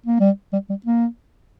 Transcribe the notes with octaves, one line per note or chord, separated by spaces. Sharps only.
A#3
G3
G3
G3
A#3